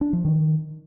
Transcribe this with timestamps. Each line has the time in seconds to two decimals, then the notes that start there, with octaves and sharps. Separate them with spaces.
0.01 D4
0.13 F3
0.25 D#3